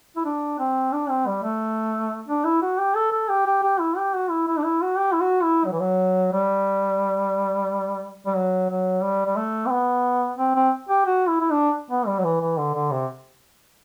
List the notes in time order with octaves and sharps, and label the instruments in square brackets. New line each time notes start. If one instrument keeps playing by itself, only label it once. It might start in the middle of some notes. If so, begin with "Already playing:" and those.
[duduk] E4
D4
C4
D4
C4
G3
A3
D4
E4
F#4
G4
A4
A4
G4
G4
G4
E4
G4
F#4
E4
E4
D4
E4
F#4
G4
E4
F#4
E4
F#3
E3
F#3
G3
G3
F#3
F#3
G3
G3
A3
C4
B3
C4
C4
G4
F#4
E4
E4
D4
B3
G3
F#3
E3
E3
D3
D3
C3